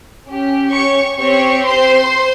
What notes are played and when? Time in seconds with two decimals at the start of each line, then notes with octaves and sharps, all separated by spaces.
0.27 C#4 G4
0.73 C#5 C#6
1.19 C4 G4 C#5 C#6
1.65 C5 C6